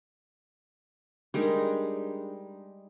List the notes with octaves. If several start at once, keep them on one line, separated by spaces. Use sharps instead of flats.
G3 G#3 D4 D#4 G#4 A#4